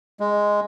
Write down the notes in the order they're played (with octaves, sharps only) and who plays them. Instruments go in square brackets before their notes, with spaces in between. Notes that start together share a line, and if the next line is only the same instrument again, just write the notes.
[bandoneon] G#3